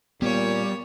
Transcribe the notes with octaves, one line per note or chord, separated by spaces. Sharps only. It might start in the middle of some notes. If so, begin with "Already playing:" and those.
A#2 G3 B3 C#5